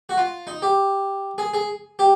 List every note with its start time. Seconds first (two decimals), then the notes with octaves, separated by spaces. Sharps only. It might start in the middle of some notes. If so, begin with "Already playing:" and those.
0.09 F#4
0.18 F4
0.47 D#4
0.62 G4
1.38 G#4
1.54 G#4
1.99 G4